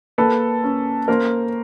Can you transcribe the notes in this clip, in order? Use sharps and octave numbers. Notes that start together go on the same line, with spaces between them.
A#3 A4 B4
C#4
A#3 A#4 C5